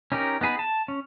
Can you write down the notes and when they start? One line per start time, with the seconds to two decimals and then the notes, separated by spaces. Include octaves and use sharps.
0.12 C#4 D#4 G4 A#4
0.41 B3 D#4 G#4 B4
0.59 A5
0.88 C#4